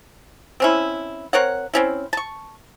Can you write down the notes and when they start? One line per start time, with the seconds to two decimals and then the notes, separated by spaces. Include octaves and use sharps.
0.60 C4 C#4 E4
1.33 C4 A#4 C#5 F#5
1.74 C4 C#4 E4
2.13 A5 C#6